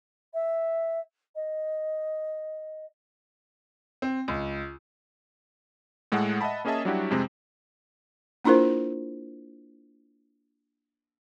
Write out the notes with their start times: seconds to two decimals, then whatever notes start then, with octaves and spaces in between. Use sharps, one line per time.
0.34 E5
1.35 D#5
4.02 C4
4.28 C#2
6.12 A2 G#3 A4 F#5
6.41 D#5 E5 F#5 A5 B5
6.65 A#3 C#4 G#4 D#5 E5 A5
6.85 F#3 G3 D4 E4 F#4 G4
7.10 F2 C3 G#3 C4
8.45 A#3 D4 E4 F4 A#4 C5